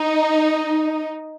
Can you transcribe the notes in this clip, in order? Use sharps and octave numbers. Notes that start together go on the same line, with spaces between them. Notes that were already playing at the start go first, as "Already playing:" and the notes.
Already playing: D#4